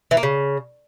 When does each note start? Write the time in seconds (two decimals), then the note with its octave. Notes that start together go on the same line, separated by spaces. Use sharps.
0.11 E3
0.17 A#3
0.23 C#3